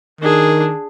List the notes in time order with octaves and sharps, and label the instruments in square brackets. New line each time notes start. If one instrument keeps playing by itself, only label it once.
[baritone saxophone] D#3 [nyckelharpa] D4 G#4